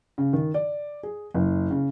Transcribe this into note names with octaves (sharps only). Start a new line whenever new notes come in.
C#3
D#3
D5
G#4
F#1
C#3